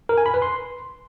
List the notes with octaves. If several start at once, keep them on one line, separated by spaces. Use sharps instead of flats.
A#4
G#5
B5
B4
C6